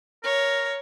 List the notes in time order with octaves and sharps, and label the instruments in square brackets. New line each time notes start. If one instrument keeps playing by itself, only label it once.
[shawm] A#4 [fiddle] C#5